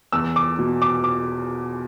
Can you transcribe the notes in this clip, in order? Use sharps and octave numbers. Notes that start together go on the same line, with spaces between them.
E2 E6
D6
B2
D6
D6